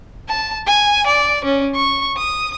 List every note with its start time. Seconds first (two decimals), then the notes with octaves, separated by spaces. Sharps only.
0.29 A5
0.67 G#5
1.07 D5
1.45 C#4
1.75 C#6
2.17 D#6